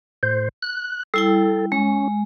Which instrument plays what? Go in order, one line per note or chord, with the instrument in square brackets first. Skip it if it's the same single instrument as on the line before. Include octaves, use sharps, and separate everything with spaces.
[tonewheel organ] A2 C5
F#6
[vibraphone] G3 E4 G5 [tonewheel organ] A4
[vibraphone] G#3 [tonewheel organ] C#4